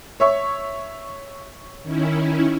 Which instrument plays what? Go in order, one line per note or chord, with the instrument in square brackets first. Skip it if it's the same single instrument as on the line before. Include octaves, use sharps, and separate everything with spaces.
[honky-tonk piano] C#5 E5 C#6
[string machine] D#3 C#4 E4